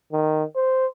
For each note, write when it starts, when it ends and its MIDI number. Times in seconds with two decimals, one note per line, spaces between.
0.12 0.43 51
0.55 0.86 72